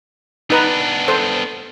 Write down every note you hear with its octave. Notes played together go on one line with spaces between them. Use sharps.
B3 D4 D#4 B4 A#5
A4 C5